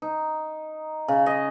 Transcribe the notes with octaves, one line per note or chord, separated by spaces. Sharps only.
D#4
C#3
D#5